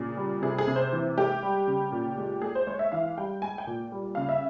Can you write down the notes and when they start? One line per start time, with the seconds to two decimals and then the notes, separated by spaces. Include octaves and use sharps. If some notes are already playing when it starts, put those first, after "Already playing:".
Already playing: A#2 C#3 G#4
0.17 G3
0.42 C3 G#4
0.58 G#4
0.67 C3
0.76 C5
0.93 E3
1.17 G#3 G4
1.43 G3
1.68 C#3
1.92 A#2
2.18 G#3
2.42 G#3 G#4
2.55 C5
2.67 G#3 C#5
2.79 E5
2.92 E3 F5
3.17 G3 G5
3.42 G#3 G#5
3.58 G5
3.67 A#2
3.92 G3
4.15 C#3 F5
4.29 E5